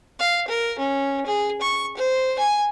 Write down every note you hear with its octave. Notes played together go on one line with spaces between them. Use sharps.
F5
A#4
C#4
G#4
C#6
C5
G#5